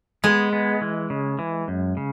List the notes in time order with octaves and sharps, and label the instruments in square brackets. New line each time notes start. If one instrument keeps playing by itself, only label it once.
[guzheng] G#3 [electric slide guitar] B3
[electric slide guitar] B3
E3
C#3
E3
F#2
C#3